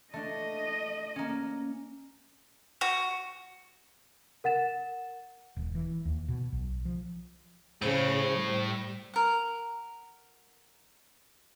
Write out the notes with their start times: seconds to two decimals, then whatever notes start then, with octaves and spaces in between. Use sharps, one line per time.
0.14 A3 D4 D#5
1.16 A#3 C#4
2.81 F#4
4.44 A#4 F#5 A6 E7
5.57 D#1
5.75 E3
6.05 D#2
6.28 B2
6.52 B1
6.85 F3
7.82 A2 C#3 C5
8.35 G3
9.14 A#4 F#5